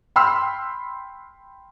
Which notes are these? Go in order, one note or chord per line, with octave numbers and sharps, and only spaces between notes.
G5 B5 C6 E6 F6